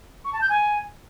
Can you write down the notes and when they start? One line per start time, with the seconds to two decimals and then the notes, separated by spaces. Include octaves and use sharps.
0.25 C#6
0.33 A5
0.41 G6
0.50 G#5